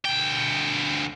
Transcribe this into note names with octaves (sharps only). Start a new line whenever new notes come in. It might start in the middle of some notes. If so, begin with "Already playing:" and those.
D2 G5